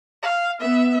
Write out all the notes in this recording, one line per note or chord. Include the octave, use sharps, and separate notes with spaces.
F5
B3 E5